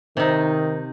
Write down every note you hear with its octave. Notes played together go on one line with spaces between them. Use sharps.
C3 D#3 D#4